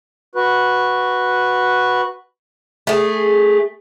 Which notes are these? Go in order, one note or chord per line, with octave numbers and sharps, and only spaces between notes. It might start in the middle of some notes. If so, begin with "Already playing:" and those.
F#4 B4
A3 G#4